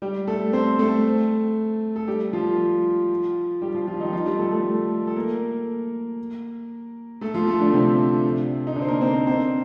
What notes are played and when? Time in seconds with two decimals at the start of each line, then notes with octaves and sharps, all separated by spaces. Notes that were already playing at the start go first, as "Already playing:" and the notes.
0.02 G3 G4
0.28 A3 A4
0.53 C4 C5
0.79 A3 A4
1.96 A4
2.08 G3 G4
2.33 F3 F4
3.62 G3 G4
3.74 F3 F4
3.87 F3 F4
4.00 D#3 D#4
4.13 F3 F4
4.26 G3 G4
4.38 A3 A4
4.51 A3 A4
5.07 A4
5.16 A#3 A#4
7.21 A3 A4
7.34 F3 F4
7.47 A3 A4
7.60 D3 D4
7.73 C3 C4
8.67 D#4
8.76 D3 D4
8.82 C5
8.88 A#3 A#4
9.01 C4 C5
9.14 A#3 A#4
9.27 C4 C5